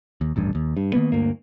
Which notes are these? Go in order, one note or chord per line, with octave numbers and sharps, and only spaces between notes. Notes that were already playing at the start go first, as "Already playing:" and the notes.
D#2
D#1 A1 G2
D#2
G2
D#3 E3 A#3 B3
D2 G2 A#3